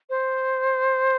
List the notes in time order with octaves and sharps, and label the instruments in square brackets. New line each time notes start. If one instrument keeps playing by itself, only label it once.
[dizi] C5